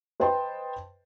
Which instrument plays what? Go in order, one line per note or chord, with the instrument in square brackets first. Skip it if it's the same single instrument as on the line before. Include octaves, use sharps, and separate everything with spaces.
[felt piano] B4 C5 D#5 G5 A5 C6